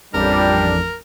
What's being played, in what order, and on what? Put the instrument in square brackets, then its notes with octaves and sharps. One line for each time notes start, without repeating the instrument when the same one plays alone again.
[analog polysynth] A1 F2 [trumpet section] G3 [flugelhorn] D4 [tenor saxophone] A#4